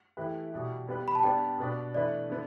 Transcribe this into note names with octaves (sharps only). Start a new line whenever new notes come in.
E3 A3 E4 G4 B4
B2 G3 E4 G4
G3 B3 G4 B4
B5
A5
G3 B3 D4 G4 G5
B2 B3 D4 B4
E3 A3 D4 B4 D5
D3 B3